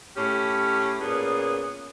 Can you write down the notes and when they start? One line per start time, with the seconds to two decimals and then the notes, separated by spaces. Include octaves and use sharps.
0.16 A2 C#4 G4
1.00 A#2 B3 C#4 G#4